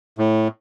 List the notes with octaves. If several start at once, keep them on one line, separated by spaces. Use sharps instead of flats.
A2